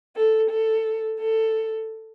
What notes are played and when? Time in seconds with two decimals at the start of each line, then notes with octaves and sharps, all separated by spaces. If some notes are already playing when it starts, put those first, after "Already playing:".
0.16 A4
0.50 A4
1.19 A4